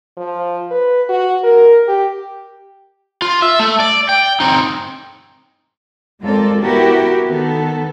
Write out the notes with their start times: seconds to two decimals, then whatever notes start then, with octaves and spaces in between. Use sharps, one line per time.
0.17 F3
0.71 B4
1.09 F#4
1.44 A#4
1.88 G4
3.22 F4
3.42 E5
3.60 A3
3.80 D5
4.09 G5
4.40 C4 D#4
6.23 G#3 C4 F4 A4 A#4 D5
6.62 B3 E4 F#4 G4 A#4
7.27 D#3 B3 A4